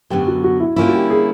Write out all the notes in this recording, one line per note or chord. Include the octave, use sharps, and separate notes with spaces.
F#2 D3 F#3 B3 G4
F#4
F#4
E4
D3 G3 A#3 C#4 E4 F4
F#4
G4
G#4